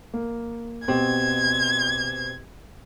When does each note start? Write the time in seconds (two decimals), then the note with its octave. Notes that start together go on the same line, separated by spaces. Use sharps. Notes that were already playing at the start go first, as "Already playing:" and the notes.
0.14 A#3
0.88 B2 C4 G4 G#6